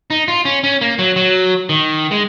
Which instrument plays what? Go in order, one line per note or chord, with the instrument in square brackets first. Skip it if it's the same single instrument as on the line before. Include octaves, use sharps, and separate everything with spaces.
[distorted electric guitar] D#4
F4
C#4
C#4
A#3
F#3
F#3
D#3
G#3